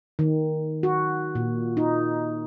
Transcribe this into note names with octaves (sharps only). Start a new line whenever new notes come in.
D#3
F#4
A#2
D#4